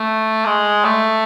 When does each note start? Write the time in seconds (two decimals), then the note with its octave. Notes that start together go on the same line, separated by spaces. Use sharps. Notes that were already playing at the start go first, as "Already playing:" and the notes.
Already playing: A3
0.45 G#3
0.85 A3